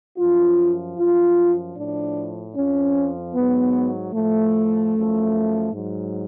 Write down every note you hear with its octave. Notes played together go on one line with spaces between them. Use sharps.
F#2 F3 F4
F#2 F3 F4
A2 F3 D4
F2 F3 C#4
G#2 F#3 B3
A2 F3 A3
F#2 F3
G#2 F#3